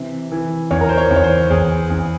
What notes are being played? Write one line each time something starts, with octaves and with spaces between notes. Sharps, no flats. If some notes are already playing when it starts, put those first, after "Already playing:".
Already playing: C3 E3 E5
E3
E2 C#5
A#4
C5
C#5
E2
C#5
C5
E2 G#4
E2